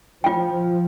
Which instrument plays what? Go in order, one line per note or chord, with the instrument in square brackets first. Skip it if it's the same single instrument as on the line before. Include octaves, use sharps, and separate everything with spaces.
[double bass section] F3 [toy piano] F4 G5